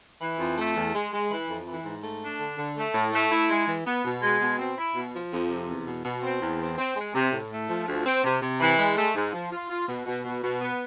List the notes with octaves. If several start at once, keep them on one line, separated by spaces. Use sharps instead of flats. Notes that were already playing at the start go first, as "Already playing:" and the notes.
E3
F2
A3
E2
G#3
G#3
E3
F2
E3
G#2
A3
D4
D3
D3
A3
A2
A3
E4
G#3
E3
B3
B2
G#3
B2
C4
E4
B2
F3
F2
C3
E2
B2
B2
C4
E2
C4
C4
G#3
C3
A2
A3
F3
D2
C4
C3
C3
E3
G#3
A3
G#2
F3
F4
F4
B2
B2
B2
B2
B3